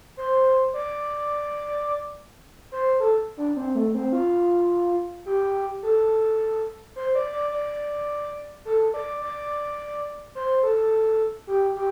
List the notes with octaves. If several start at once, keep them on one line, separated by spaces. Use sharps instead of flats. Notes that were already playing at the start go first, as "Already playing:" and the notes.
C5
D5
C5
A4
D4
C4
A3
C4
F4
G4
A4
C5
D5
D5
D5
A4
D5
D5
C5
A4
G4
G4